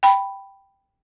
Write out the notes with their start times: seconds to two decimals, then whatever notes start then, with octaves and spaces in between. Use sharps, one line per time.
0.03 G5 B5